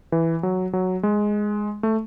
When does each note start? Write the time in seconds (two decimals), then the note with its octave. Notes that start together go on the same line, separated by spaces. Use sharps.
0.12 E3
0.43 F#3
0.73 F#3
1.03 G#3
1.83 A3